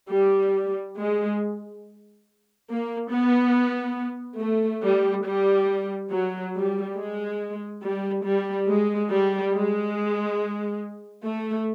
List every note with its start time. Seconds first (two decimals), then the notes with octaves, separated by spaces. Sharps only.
0.11 G3
0.97 G#3
2.69 A#3
3.11 B3
4.40 A3
4.83 G3
5.25 G3
6.11 F#3
6.54 G3
6.96 G#3
7.83 G3
8.25 G3
8.68 G#3
9.11 G3
9.54 G#3
11.26 A3